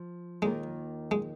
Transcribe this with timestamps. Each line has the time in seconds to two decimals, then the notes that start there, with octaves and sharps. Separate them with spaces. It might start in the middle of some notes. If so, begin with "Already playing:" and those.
Already playing: F3
0.42 D#2 D#3 G#3 A#3 F4 A#4
1.11 G#3